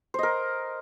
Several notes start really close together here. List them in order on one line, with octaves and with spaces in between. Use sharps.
C5 D#5 A#4